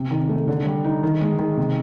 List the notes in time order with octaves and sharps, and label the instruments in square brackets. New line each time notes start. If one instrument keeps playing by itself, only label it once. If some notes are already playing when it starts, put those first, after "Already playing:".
Already playing: [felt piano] C3
D#3
A3
D3
G3
D#4
D#3
G#3
D#3
C3